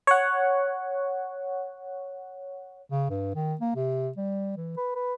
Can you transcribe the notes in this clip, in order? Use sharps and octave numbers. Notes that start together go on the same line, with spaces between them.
C#5 F#5
C#3
G2
D#3
A#3
C3
G3
E3
B4
B4